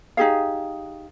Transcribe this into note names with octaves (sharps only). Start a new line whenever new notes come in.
D#4 G4 G#4 F5